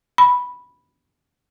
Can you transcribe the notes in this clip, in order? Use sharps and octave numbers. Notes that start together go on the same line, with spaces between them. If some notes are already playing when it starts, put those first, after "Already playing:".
B5